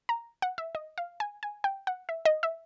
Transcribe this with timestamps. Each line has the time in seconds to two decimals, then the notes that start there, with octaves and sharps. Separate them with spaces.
0.09 A#5
0.42 F#5
0.58 E5
0.75 D#5
0.98 F5
1.20 G#5
1.43 G#5
1.64 G5
1.87 F#5
2.09 E5
2.25 D#5
2.43 E5